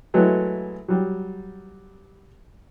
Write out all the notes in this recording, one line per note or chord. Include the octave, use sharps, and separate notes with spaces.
E3 F#3 G#3 A3
F#3 G3